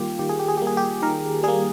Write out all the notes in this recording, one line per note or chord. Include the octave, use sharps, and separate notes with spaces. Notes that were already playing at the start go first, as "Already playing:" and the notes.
Already playing: D#3 G3 A#3 F4 G4
D#3 G4
G#4
G4
G#4
G3 A#3 G4
G#4
G4
D#3 A#4
G3 A#3 G#4